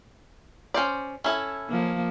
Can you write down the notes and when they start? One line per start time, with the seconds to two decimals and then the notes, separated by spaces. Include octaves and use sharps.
0.74 C#4 C5 D5
1.24 C#4 E4 A4
1.69 F3 A#3